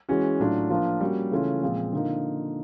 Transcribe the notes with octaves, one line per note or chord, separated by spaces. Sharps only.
E3 G#3 C#4 F#4
A2 F#3 A3 D4 F4
F3 A#3 D4 F4
G3 A#3 C#4 F#4
C#3 E3 A3 C#4 F4
A#2 F3 G#3 C4
D3 F3 A#3 D#4